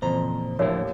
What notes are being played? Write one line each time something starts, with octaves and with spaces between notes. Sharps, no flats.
F2 A#2 C#3 E3 C5 A#5
D#2 A2 F3 D4 E4 A#4 C#5 E5